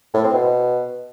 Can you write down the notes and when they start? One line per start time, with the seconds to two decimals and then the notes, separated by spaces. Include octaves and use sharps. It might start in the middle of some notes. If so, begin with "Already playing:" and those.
0.14 A2
0.23 C4
0.33 B2